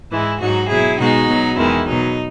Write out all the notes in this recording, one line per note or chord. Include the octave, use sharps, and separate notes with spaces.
G#2 E3 G#3 E4
G#2 F#3 D#4 F#4
B2 F#3 E4 G#4
B2 G#3 D#4 F#4
B2 F#3
E2 D#3 G#3 E4
B2 F#3 D#4